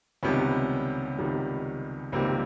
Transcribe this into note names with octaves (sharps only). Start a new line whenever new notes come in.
C#2 C3 D#3 G3 B3 C#4
C#2 C3 D#3 G3
C#2 C3 D#3 G3 A#3 C4